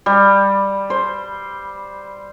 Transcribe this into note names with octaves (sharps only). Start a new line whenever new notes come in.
G3
C5